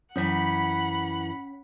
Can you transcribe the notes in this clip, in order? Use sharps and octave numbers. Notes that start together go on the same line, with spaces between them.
F#2 E3 C#4 C#5 F#5 B5 B6